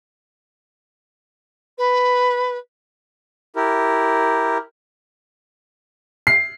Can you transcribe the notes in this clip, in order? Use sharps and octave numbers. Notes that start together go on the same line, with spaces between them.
B4
E4 G4 A#4
C7